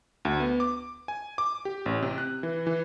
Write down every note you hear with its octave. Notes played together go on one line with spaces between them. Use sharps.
D2
B3
D6
G#5
D6
G4
A1
C3
F#6
E3
E3